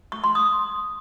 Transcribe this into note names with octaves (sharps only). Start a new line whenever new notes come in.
C#6
C6
D#6